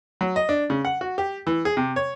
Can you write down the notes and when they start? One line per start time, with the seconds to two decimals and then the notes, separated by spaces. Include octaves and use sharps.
0.21 F#3
0.36 D#5
0.49 D4
0.70 C#3
0.85 F#5
1.01 F#4
1.18 G4
1.47 E3
1.65 G#4
1.77 C3
1.96 C#5